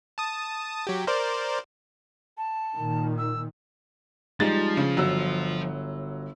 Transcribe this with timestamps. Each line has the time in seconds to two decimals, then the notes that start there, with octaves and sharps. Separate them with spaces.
0.18 A5 D#6
0.87 F#3 G4
1.07 A#4 C5 D5
2.38 A5
2.74 A#2 D#3
3.18 E6
4.40 F3 G3 G#3 D#4 A6
4.77 C#3
4.97 G1 F#3 E6